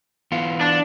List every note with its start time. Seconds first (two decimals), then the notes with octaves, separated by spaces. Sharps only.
0.32 E3 B3 F4
0.61 D4